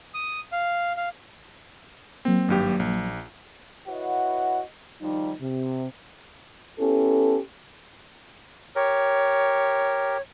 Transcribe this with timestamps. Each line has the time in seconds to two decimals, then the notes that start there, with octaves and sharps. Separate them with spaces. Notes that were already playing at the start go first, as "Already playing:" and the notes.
0.14 D#6
0.52 F5
0.97 F5
2.25 F#3 A#3 C4
2.49 G#1 G2 G4
2.80 A#1
3.88 E4 F#4 B4 C#5 D#5 F#5
5.01 D#3 F3 G3 D#4
5.41 C3
6.79 B3 C#4 E4 G4 A4
8.75 G4 A#4 C#5